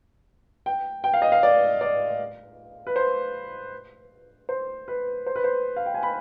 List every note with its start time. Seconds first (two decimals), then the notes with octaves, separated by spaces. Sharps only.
0.66 G5
1.04 G5
1.14 F5
1.22 D#5
1.32 F5
1.43 D5
1.81 D5
2.87 B4
2.96 C5
4.49 C5
4.88 B4
5.27 C5
5.36 B4
5.44 C5
5.77 F5
5.86 G5
5.94 G#5
6.03 B5